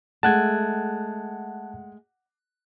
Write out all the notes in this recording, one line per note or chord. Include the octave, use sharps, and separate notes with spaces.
G#3 A3 F#5 A5 F#6 G#6